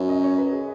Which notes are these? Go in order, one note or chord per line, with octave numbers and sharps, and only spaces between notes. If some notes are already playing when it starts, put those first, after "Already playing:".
Already playing: F#2
D#5
C#5
B4
G#4